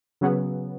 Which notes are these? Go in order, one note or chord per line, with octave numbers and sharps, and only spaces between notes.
C#3 F#3 B3